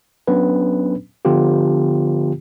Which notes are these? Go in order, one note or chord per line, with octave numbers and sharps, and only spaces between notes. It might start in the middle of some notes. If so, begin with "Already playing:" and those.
F#3 B3 C#4 D4 B4
D3 F3 B3 F4 G4